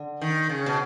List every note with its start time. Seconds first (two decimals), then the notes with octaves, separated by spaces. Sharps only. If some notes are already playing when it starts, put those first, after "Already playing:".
Already playing: D3
0.21 D#3
0.49 C#3
0.66 B2